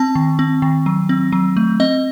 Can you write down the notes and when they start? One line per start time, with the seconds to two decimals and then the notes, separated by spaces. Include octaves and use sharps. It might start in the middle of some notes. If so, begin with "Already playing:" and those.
Already playing: C4 A5
0.15 D#3
0.39 C4
0.62 D#3
0.86 F#3
1.09 C4
1.32 F#3
1.57 A3
1.80 C4 D#5